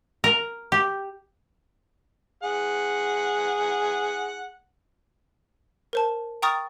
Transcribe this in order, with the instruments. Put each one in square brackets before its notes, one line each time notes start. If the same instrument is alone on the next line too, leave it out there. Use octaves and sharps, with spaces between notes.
[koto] A#4
G4
[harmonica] G#4 F#5
[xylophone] A#4 C5 A5
G5 A#5 C#6 D#6 F6 A6